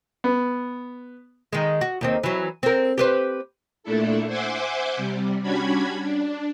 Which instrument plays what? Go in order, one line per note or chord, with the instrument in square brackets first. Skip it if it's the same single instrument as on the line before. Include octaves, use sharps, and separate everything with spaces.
[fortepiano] B3
[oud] D#3 G#3
F#4
D#2 D#3 C4
E3 F#3
C4 A#4
G4 B4 C5
[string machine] A#2 A3 D4 E4 A4
C5 E5 F#5 G#5 C6 D6
C3 G3
G3 C#4 D4 F#4 B5 G#6
D4